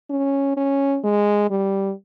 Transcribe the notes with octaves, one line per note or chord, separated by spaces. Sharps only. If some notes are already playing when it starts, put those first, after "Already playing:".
C#4
C#4
G#3
G3